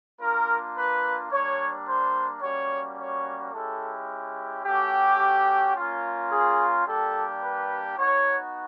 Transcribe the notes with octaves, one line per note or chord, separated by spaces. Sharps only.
A#3 D4 F4 A#4
B4
G3 A#3 D4 C#5
C5
G3 A#3 C#4 F#4 C#5
C#5
G#3 C#4 E4 G4 A4
A3 C#4 F#4 G4
A#3 C#4 F4
G#4
G3 A#3 D4 G4 A4
B4
B3 D#4 F#4 C#5